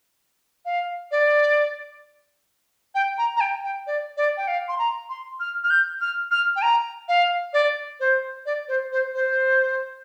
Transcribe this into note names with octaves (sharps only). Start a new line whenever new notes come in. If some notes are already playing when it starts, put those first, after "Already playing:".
F5
D5
G5
A#5
A#5
G5
G5
D5
D5
G5
F5
C6
A#5
C6
F6
F6
G6
F6
F6
G5
A#5
F5
D5
C5
D5
C5
C5
C5